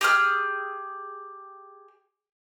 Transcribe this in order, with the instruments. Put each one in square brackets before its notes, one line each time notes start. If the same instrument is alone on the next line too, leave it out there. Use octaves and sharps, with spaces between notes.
[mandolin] G4 G#4 F6